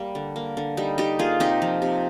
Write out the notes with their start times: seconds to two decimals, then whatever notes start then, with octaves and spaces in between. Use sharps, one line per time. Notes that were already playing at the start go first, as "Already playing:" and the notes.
Already playing: G3 A#3
0.15 D3
0.36 A#3
0.57 D3
0.77 G3 D#4
0.98 D3 D#4 G4
1.19 A#3 F4 G#4
1.40 C3 D#4 G4
1.62 F3
1.82 C3